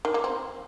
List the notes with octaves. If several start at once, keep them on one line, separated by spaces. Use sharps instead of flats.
D#3
A#3
C4